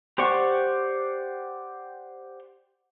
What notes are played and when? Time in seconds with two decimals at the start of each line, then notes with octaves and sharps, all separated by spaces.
0.18 G4 C5 D5 F#5 C#6